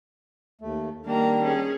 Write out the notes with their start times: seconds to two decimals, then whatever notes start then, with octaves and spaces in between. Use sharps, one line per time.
0.61 D#2 A3
1.06 D#3 G3 A#3 D4 A#5
1.43 C#4 G#4